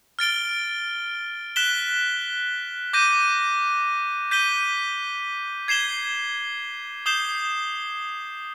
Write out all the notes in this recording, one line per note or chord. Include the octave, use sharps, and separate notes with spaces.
F6 A6 D7 G7
F#6 B6 E7 G7
D6 G6 A#6 D#7
G6 B6 D#7 G7
G#6 C7 E7 G7
D#6 G6 C7 E7 G7